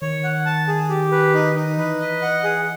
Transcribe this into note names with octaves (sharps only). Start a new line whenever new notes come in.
D#3 C#5
F#5
A5
G#4
G4
B4
D#4
D#4
E3 B4
D#5
F#5
G#4